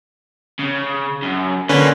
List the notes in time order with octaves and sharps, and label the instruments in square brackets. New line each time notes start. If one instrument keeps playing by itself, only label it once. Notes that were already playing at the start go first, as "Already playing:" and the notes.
[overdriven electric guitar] C#3
F#2
[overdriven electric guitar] A#2 A#3 [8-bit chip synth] D3 C#4 B4